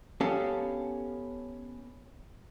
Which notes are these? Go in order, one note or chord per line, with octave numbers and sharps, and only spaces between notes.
B3 C#4 G4 A4 F5